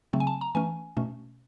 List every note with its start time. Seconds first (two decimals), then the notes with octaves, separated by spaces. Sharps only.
0.13 C#3 F#3 A3 C4
0.20 G#5
0.27 A5
0.41 A#5
0.55 E3 A3 C#4 G#5
0.97 B2 A3 C#4